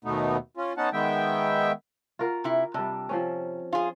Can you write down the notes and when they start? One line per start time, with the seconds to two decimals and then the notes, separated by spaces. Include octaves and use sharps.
0.04 D#2 B2 A3 B3 D#4
0.57 C#4 F4
0.77 B3 C#4 D#4 F#5 A5
0.93 D#3 G#3 B3 E5 G5
2.19 F4 F#4 A#4
2.44 C3 E4
2.74 C3 G3 D4
3.09 F3 C4 C#4
3.73 F4 G#4